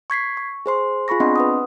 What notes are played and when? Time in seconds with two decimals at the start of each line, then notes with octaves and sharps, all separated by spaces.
0.10 C#6 G#6 B6 C7
0.37 C#6
0.66 G#4 C5 C6
1.08 F4 G#4 B5 C#6 A#6
1.20 B3 C4 D4 D#5 F#5 C6
1.36 B4 F#5 D#6